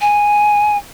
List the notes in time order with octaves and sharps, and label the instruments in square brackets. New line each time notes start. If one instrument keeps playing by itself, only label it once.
[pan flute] G#5